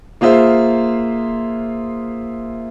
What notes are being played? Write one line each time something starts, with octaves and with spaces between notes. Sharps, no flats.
A#3 F4 G#4 C5 E5